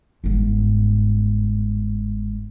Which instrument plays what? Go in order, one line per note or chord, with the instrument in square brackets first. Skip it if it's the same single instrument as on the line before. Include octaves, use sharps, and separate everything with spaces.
[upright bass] G1 G#2